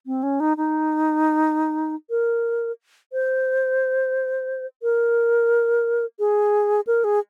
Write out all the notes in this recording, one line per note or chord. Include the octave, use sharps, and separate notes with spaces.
C4
C#4
D#4
D#4
A#4
C5
A#4
G#4
A#4
G#4